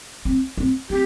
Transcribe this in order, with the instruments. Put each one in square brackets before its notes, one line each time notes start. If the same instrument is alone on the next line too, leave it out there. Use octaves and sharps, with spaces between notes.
[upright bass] C4
C4
[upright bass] C4 [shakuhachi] G4